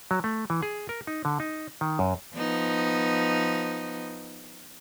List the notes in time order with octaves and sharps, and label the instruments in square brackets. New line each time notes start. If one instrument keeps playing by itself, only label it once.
[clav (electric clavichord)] F#3
A3
E3
G#4
A#4
D#4
D3
D#4
D#3
F#2
[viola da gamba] F3 B3 D#4